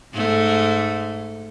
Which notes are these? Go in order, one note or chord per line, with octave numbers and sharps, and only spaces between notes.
G#2 A3